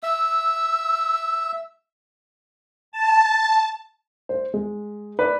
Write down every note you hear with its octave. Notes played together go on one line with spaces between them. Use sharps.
E5 E6
A5
C5
G#3
B4 D5